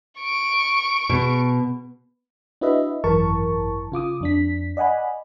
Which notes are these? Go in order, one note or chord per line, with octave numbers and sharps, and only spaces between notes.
C#6 D7
B2
D4 E4 F#4 B4 D#5 E5
G#1 F#2 E3 A#4 A5 C#6
C#3 F4 D6 D#6
F2 D4 B6
D5 D#5 F#5 G#5 B5